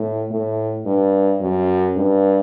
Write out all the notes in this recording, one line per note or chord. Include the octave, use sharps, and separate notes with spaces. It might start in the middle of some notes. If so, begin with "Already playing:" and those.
Already playing: A2
A2
G2
F#2
G2